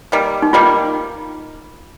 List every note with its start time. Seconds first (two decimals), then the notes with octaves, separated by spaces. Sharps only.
0.12 D#3 G3 A#3
0.42 D#4
0.53 D#3 G3 A#3 F4